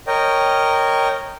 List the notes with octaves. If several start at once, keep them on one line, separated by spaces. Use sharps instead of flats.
A#4 C#5 D#5 G5